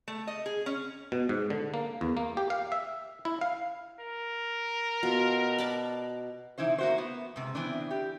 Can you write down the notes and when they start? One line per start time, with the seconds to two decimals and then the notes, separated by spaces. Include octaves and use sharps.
0.08 A3
0.27 D#5
0.46 G#4
0.66 C#4
1.12 B2
1.29 G#2
1.50 D3
1.74 A#3
2.01 E2
2.17 A#3
2.37 G4
2.50 F5
2.72 E5
3.25 E4
3.41 F5
4.00 A#4
5.03 B2 F4
5.58 D5 A5 B5
6.58 C3 E3 D#4 E4 C5
6.78 A#3 F#4 C5
6.98 B3
7.36 G#2 C3
7.55 E3 B3 C4 D4
7.91 G4